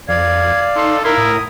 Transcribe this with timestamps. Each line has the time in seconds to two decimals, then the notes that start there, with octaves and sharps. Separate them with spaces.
0.09 F2 D5 F5 G#6
0.75 D#4 A4 C6
1.04 E4 A#4 F5 C6
1.17 A2 D#6